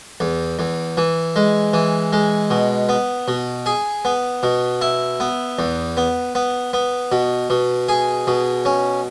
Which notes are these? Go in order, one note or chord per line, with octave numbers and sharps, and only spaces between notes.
E2
E2
E3
G#3
E3
G#3
B2
B3
B2
G#4
B3
B2
E4
B3
E2
B3
B3
B3
B2
B2
G#4
B2
C#4